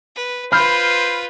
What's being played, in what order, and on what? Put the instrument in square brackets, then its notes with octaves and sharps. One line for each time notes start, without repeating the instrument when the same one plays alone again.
[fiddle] B4
[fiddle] F4 B4 [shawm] C5 [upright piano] B5 F6 G6